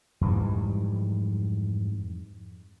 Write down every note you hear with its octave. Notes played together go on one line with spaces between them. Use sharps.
F2 G#2 E3 G3